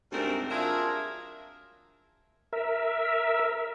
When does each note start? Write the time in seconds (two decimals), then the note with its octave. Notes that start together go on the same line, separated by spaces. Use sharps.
0.12 D2 G#2 G3 A3 C4 A#4
0.50 F#3 D4 F4 G#4 A#4 E5
2.53 A#4 E5